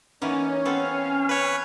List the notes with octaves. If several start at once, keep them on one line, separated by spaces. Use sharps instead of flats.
E3 A#3 B3 C#4 D#4
B3 C4 A4 F5 G#5
B4 C#5